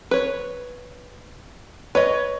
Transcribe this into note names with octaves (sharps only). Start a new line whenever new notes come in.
B4 C#5
B4 C#5 D#5